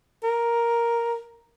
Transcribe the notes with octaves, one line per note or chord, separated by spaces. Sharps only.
A#4